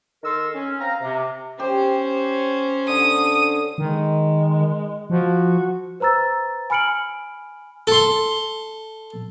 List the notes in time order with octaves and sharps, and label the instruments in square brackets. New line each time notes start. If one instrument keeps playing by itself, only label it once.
[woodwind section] D#3 A4 A#4 C6 E6
C#4
C4 C5 F5 A#5
C3
[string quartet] C#4 C5 [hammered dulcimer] G4
[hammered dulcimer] D3 [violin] D#6
[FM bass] D#3 [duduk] G#3
[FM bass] F3 [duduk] F#4
[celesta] B4 C5 A#5 E6 A6
G#5 B5 F6 C#7 D7 F#7
[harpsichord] A4 C6